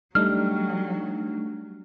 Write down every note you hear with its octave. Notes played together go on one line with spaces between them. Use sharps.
F#3 G3 A3 D4 D#4 F6